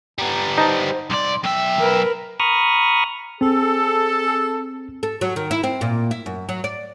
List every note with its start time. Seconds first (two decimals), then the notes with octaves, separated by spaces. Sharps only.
0.19 G3 B3 A#5
0.58 D#4 C5 A5
1.10 C2 D5 C6
1.44 B1 E5 G5
1.79 A#4 B4
2.40 A#5 B5 C#6 D#6 F6
3.41 C4 G#4 A4
5.03 A4
5.21 F#3
5.36 D#3
5.51 E4
5.63 C4
5.81 A#2
6.11 E4
6.26 F#2
6.49 F#3
6.64 D5